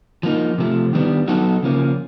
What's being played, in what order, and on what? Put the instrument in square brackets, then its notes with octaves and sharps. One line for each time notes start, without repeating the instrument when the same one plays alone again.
[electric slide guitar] F3 A#3 D#4
C3 F3 A3
D#3 G3 B3 D4
F#3 B3 D#4 F#4 A4
C#3 F3 A#3 C#4